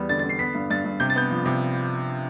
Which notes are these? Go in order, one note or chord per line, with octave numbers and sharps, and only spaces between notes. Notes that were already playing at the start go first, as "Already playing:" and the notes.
Already playing: E2 G3 B3
D3 A6
D3 A6
C7
B3 B6
G2
G2 A6
G2
C3 G6
A6
B3 G6
F3
C3